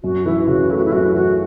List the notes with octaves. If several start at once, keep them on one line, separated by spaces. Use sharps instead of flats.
F#2 F#4
E3 E4
C#3 F#4
A3 E4
F#4
E4
F#2 F#4
E3 F#4